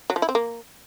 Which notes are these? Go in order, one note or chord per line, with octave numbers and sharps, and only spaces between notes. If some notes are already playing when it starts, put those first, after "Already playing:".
F#3
F3
E4
C4
A#3